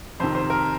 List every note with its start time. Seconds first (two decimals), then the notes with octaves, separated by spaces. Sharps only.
0.20 F2 C3 D#3 C5
0.35 C5
0.50 A#4